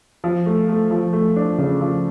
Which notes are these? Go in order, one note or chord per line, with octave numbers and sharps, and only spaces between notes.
F3
A3
A3
F3
A3
D4
C#3
F3